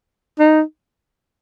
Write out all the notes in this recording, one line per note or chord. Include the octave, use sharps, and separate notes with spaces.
D#4